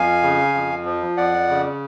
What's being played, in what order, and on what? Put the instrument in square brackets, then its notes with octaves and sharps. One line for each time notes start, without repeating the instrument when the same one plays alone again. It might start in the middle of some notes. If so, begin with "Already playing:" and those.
Already playing: [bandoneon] F2 F5 G#5
C#3
F2
F3
F2 D5 F#5
C#3